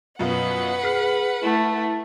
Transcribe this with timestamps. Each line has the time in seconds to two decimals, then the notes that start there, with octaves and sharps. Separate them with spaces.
0.19 F#2 B2 F4 B4 F#5
0.83 G#4 F6 B6 C7
1.43 A3 E4